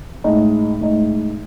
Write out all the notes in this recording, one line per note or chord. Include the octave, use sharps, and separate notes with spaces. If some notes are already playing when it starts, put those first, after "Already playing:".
A2 G#3 D#4
A2 G#3 D#4